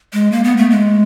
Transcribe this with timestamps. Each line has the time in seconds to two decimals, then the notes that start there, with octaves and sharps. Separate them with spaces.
0.13 G#3
0.32 A#3
0.44 B3
0.57 A3
0.70 G#3